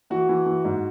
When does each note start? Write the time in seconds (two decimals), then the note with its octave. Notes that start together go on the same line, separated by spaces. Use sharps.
0.10 E3 F#4
0.29 E3
0.46 E3
0.65 G#2